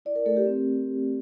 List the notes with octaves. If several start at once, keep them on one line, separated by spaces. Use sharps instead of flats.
E4 D5
A#4
A3 A4
G4
C4